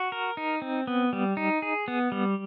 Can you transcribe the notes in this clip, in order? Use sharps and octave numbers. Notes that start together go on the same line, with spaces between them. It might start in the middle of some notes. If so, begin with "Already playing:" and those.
Already playing: F#4
A#4
D#4
C4
B3
G3
D#4
G#4
B3
G3